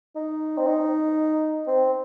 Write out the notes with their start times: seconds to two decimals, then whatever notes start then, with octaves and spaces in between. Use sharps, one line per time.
0.16 D#4
0.58 C4
0.67 D#4
1.67 C4